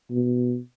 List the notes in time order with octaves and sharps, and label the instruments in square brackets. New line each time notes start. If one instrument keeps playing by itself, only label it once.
[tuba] B2